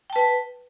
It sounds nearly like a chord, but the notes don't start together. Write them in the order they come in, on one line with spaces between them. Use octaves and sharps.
G5 A5 B4